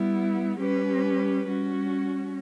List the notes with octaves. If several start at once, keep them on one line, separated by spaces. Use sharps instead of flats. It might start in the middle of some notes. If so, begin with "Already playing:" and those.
Already playing: G3 B3 E4
G3 C#4 G4 B4
G3 C#4 F#4